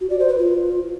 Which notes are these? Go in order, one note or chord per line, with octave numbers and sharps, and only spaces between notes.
F#4
D5
C5
B4
F4